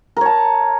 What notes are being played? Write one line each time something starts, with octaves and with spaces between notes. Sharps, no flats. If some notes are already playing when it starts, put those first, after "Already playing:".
A#4 C#5 A5